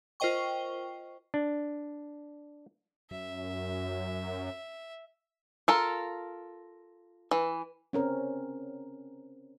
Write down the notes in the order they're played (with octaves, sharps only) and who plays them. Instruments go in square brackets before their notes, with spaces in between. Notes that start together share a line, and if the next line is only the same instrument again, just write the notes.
[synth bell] F4 A#4 C5 D#5 G5 C#6
[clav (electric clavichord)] D4
[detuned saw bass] F#2 [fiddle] E5
[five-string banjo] F4 A4 A#4
E3
[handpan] C4 C#4 A#4